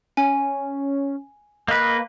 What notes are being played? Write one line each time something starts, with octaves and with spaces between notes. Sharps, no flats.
C#4 G#5
A#3 B4 D#5